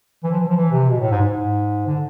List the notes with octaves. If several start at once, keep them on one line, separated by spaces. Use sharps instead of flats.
E3
F3
E3
F3
E3
C3
B2
A2
G#2
G#2
D3